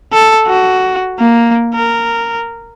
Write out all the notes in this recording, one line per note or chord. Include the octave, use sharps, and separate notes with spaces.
A4
F#4
A#3
A#4